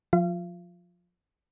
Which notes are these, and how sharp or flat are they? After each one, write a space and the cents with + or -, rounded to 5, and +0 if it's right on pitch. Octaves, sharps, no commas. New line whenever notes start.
F3 +25 F4 +5 F5 -35